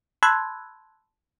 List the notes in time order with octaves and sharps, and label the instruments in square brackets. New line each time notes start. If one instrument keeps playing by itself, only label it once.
[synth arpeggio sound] A5 B5 C6 E6 F#6 G#6